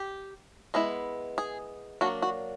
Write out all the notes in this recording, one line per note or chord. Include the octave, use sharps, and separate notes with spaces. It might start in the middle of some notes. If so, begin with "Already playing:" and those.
Already playing: G4
G#3 B3 E4
G#4
F#3 A#3 D4 F#4
F#4